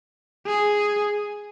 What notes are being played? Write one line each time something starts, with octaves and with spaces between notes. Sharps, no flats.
G#4